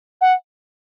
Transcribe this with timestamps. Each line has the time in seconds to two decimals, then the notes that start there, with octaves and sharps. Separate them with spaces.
0.21 F#5